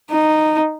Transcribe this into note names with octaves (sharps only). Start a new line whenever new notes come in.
D#4